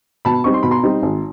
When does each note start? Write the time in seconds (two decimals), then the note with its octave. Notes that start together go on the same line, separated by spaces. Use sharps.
0.25 B2 A5 B5
0.44 G3 C4 D#4 C#6
0.54 C6
0.63 B2 B5
0.71 A#5 C6
0.83 G3 C4 D#4
1.03 G#1